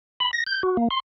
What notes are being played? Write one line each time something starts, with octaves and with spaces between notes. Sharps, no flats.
B5
A#6
G6
F#4
A#3
C6